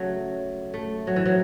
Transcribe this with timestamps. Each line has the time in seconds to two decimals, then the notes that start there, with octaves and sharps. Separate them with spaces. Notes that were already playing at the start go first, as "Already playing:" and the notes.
Already playing: C#3 F#3 A3
0.74 A3
1.07 F#3
1.16 E3
1.26 F#3